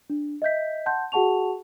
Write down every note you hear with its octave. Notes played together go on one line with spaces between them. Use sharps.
D4
D#5 E5 G6 B6
F#5 A5 C6 G6
F#4 G#4 F#5 A5 C#6 F7